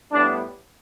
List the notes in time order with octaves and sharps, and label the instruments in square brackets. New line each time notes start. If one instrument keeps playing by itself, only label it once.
[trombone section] A2 G3 B3 D4